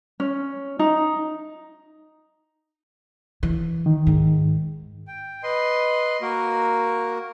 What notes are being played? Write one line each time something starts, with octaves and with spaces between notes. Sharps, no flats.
C#4
D#4
E3
D#3
G#2
G5
B4 D#5 C6
A#3 F#4 A#4